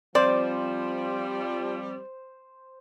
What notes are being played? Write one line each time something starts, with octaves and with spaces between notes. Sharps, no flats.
F3 G3 C4 C5 D5